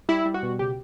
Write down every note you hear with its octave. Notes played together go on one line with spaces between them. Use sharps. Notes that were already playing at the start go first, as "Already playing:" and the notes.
G3 E4
G3
F#4
B2
C#3 G4